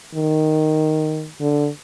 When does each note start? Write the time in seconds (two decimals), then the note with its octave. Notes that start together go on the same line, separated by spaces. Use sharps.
0.14 D#3
1.41 D3